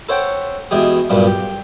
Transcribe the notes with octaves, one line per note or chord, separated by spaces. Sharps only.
A4 C5 C#5 F#5 G5
B2 E3 G#3 G4 G#4
B1 G2 A#2 G3
G4